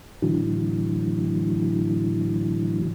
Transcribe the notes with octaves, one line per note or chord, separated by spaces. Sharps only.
A2 D3 E3 F#3